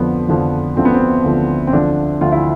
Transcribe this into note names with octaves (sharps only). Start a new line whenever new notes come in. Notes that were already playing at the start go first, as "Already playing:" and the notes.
Already playing: F2 D3 F3 B3
F2 D3 F3
D2 D3 F3 C4
B3
C4
D2 D3 F3
C4
D2 D3 F3 D4
D2 D3 F3 F4
E4